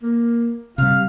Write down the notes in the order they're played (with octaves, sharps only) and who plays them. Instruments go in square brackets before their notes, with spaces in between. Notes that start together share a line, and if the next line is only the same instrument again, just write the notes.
[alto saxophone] A#3
[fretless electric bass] C3 G3 [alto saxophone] F5